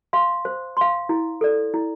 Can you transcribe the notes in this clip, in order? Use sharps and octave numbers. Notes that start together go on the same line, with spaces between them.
F5 C6
C5
F5 C6
E4
A4 D5
E4